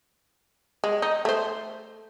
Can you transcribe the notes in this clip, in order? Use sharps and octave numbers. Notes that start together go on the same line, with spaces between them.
G#3
D#4
A3 C5